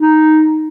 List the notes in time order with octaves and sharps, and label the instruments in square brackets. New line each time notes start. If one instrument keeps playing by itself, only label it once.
[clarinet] D#4